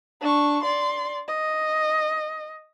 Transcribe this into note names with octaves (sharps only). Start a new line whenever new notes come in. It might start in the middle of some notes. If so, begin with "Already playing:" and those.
D4 C#6
D5 C6
D#5